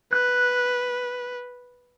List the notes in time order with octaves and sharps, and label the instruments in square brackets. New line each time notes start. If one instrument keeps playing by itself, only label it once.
[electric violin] B4 [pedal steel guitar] F#6